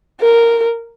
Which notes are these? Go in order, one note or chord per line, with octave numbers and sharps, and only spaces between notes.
A#4